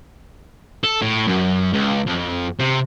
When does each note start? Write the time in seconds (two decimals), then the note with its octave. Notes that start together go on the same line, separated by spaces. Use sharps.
0.84 A4
1.02 A2
1.27 F#2
1.73 C#2
2.06 F2
2.59 C3